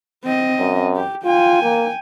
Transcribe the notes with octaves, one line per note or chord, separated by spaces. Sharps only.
C4 D#5
F#2
G4
F4 G5 G#5
A#3